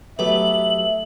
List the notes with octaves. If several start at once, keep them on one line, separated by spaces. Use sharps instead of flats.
F#3 A3 B3 G4 B4 E5 D6 F#7